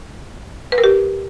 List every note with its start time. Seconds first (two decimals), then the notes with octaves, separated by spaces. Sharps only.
0.72 B4
0.78 A#4
0.84 G4